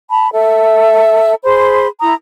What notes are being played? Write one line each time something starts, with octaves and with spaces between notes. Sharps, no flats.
A5 B5
A4 E5
G#4 C5 B5 C6
E4 A#5 D#6